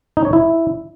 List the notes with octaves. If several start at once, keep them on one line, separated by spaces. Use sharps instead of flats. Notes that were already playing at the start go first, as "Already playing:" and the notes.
D#4
C#5
E4